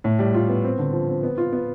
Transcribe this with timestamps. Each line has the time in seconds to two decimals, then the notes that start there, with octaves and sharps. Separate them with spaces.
0.04 A2
0.19 G3
0.34 F4
0.49 B3
0.64 C4
0.78 D3
0.93 F3
1.09 C4
1.23 B3
1.38 F4
1.53 B3